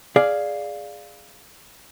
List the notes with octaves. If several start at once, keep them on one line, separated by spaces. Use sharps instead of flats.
G#4 D5 F5